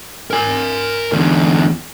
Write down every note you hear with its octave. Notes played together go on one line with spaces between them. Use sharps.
A#4 G#5
E2 D3